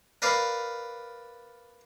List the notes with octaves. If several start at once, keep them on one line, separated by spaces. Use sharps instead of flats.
A#4 B4 D5 F5